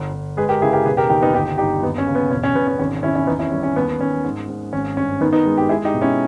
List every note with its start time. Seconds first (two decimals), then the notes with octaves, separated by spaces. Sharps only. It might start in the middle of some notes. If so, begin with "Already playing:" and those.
Already playing: G1
0.13 G1
0.37 G#3 G#4 B4
0.49 G4 A#4
0.62 C#3 E4 G#4
0.73 G4 A#4
0.86 E1 G#4 B4
0.97 G4 A#4
1.09 D#2 D#4 G4
1.22 B3 D#4
1.34 G1 D#4 G4
1.58 G2 D#4 G4
1.83 D#2 B3 D#4
1.98 C#4
2.07 C#3
2.15 B3
2.31 E1 C#4
2.43 C#4
2.55 E1 B3
2.67 C#4
2.79 G#1 C#4
3.03 G#1 C#4 E4
3.15 C#4 E4
3.27 E2 B3 D#4
3.39 C#4 E4
3.52 G3 C#4
3.63 C#4
3.76 D#2 B3
4.00 D#2 C#4
4.24 G#2
4.49 G#2
4.73 G#1 C#4
4.97 G2 C#4
5.21 D#3 B3 D#4
5.33 B3 D#4
5.46 G#3
5.57 D#4 G4
5.69 G#3 E4 G#4
5.85 D#4 G4
5.94 B2
6.01 C#4 E4